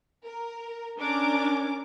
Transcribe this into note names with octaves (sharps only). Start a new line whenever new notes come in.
A#4
C#4 D4 A#4 D6